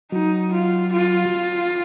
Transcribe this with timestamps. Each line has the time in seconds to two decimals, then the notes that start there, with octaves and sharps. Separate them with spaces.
0.12 F#3 D#4
0.53 F4
0.93 F4